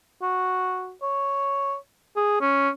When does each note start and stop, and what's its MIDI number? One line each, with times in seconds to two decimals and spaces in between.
0.22 0.93 66
1.02 1.75 73
2.16 2.41 68
2.41 2.70 61